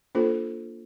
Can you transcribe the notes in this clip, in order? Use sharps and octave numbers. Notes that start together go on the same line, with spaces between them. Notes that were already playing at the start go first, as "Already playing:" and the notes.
A#3 D4 F4 A4 C5